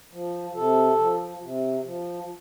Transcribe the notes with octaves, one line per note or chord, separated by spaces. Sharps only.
F3
C3 A4
F3
C3
F3